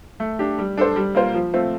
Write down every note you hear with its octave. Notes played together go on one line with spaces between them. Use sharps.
A3
D4 G4
G3
D4 A4 C5
G3
A#3 F4 C5
F3
A3 C4 F4